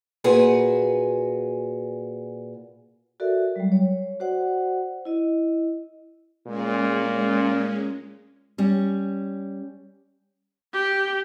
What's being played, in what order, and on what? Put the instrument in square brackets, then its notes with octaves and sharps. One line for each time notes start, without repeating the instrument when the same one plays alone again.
[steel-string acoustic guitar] A#2 F#4 G#4 B4
[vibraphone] F#4 A4 A#4 D5 E5
F#3 G3
C#5
F#4 C5 D5 F#5
E4 D#5
[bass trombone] A#2 [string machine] G#3 C#4
[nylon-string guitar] G3 C#4
[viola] G4